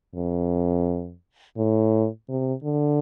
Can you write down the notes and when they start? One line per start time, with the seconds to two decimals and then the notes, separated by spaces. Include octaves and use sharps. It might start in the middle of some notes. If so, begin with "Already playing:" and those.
0.15 F2
1.57 A2
2.28 C3
2.64 D3